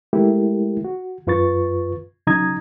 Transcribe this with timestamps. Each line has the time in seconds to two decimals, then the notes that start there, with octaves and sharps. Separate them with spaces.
0.13 G#3 A3 E4 G4 A#4
0.84 F#4
1.27 F#2 F4 B4 C#6 A6
2.27 C#3 F#3 D#4 A#5 D#6 G#6